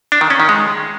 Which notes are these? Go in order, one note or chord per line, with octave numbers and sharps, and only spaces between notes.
D4
D#3
C#4
D#3
G#3